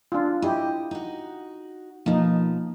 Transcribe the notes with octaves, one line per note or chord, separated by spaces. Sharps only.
D4 F4
E4 G4 D#5
D#4 F#4
B2 F3 A#3 D#4